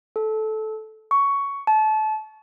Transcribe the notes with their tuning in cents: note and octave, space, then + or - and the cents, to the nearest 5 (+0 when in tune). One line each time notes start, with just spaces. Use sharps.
A4 -15
C#6 +10
A5 -25